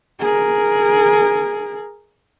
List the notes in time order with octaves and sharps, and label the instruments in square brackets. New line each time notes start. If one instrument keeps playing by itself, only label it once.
[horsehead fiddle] G#4 A#4